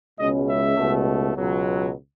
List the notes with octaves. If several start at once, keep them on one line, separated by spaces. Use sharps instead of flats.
C#2 B2 G#3 C#4 D#5
E5
C#2 B2 A3
C#2 B2 F#3